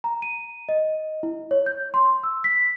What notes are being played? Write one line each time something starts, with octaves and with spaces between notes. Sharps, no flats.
A#5
D#7
D#5
E4
C#5
G6
C6
E6
B6